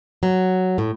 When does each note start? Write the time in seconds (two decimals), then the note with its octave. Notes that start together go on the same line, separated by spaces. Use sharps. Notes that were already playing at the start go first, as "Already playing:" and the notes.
0.23 F#3
0.78 A2